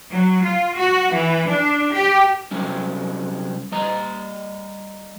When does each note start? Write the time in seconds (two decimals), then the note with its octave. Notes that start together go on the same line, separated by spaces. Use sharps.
0.11 F#3
0.43 F4
0.76 F#4
1.13 E3
1.48 D4
1.92 G4
2.51 C3 F#3 G3 C#4
3.72 G3 D#5 A#5